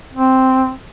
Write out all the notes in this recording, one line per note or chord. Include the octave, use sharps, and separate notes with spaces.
C4